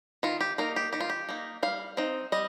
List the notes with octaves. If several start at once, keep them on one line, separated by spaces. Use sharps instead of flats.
D#3 F4
G4
A#3 D#4 A#4
G4
D#3 G4
F4
G4
A#3 D#4
G3 F5
C4 D#4
G3 D#5